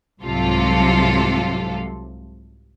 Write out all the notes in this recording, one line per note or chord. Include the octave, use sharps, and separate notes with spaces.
C2 G#2 C3 F#3 F4 A4